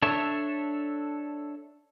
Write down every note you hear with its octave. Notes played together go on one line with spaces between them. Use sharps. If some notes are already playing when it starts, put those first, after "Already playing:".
D4 A4 C#5 E5